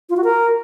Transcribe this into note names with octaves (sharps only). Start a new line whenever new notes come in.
F4
F#4
A#4